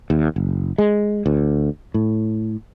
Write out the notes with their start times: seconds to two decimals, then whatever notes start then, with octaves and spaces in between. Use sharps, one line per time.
0.10 D#2
0.36 F#1
0.78 G#3
1.26 D2
1.94 A2